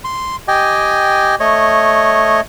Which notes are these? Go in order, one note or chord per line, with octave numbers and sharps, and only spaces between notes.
C6
G4 D#5 G5 G#5
A3 C#5 D#5